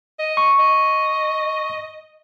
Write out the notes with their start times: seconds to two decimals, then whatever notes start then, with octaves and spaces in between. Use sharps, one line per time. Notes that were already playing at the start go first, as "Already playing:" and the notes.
0.19 D#5
0.37 C#6
0.59 D#5